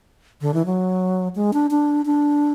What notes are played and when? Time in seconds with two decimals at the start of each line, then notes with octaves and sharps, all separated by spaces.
0.41 D3
0.54 E3
0.66 F#3
1.35 G#3
1.53 D4
1.71 D4
2.06 D4